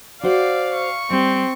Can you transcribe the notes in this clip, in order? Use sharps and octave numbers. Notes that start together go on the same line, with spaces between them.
F#4 C5 D5 F5 F#5
C#6
G3 C4